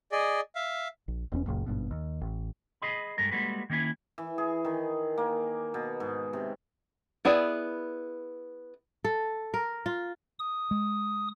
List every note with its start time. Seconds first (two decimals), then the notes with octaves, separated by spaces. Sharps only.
0.12 G#4 D5 D#5
0.55 E5 F5
1.08 A#1
1.32 E1 E2 C4 C#4
1.46 F#1 C#2 F#2 A#2
1.66 G#1 G2 B2
1.91 D#2
2.21 A1
2.82 G#4 D#5 B5
3.18 G2 G#3 A3 A#4
3.31 G3 G#3 A#3 F#4 A4 B4
3.70 D#3 A#3 C#4 E4 G#5
4.18 E3
4.38 G#4
4.65 D#3
5.18 A#3
5.74 B2
6.00 G#2
6.33 C3
7.25 B3 E4 G#4 D5
9.05 A4
9.54 A#4
9.86 F4
10.39 D#6
10.71 G#3